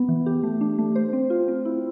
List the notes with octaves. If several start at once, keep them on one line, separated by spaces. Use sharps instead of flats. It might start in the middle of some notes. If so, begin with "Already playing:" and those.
Already playing: B3
E3
G4
A3
D4
A3
C5
C4
F4
C4
E4